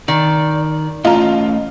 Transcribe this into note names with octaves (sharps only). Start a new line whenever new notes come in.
D#3 D5
A3 C#4 F4 D#5 A#5